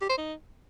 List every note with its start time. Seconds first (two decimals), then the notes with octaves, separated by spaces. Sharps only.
0.01 G4
0.09 C5
0.18 D#4